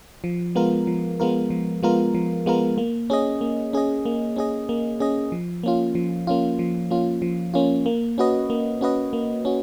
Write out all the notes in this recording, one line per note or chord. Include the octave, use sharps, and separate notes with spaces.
F3
G#3 B3 F4 A#4
F3
G#3 B3 F4 A#4
F3
G#3 B3 F4 A#4
F3
G#3 B3 F4 A#4
A#3
C#4 G#4 D#5
A#3
C#4 G#4 D#5
A#3
C#4 G#4 D#5
A#3
C#4 G#4 D#5
F3
A#3 C#4 F4
F3
A#3 C#4 F4
F3
A#3 C#4 F4
F3
A#3 C#4 F4
A#3
C#4 F#4 B4 D#5
A#3
C#4 F#4 B4 D#5
A#3
C#4 F#4